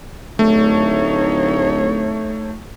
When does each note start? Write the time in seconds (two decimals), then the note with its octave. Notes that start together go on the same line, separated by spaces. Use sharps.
0.39 D1 A3 D#4 C#5